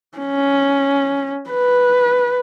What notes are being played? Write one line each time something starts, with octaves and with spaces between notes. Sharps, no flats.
C#4
B4